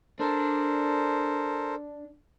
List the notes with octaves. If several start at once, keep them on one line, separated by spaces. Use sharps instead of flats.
D4 A4 A#4 C5